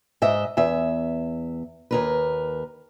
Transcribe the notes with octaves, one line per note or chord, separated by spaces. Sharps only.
G#2 D#5 E5
E2 E5
D#2 A#4 B4